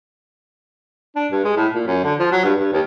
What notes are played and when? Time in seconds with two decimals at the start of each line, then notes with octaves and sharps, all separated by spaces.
1.16 D4
1.32 G2
1.44 G#3
1.57 A2
1.74 A#2
1.87 F#2
2.04 D3
2.19 F3
2.32 F#3
2.45 G2
2.59 G2
2.73 D#2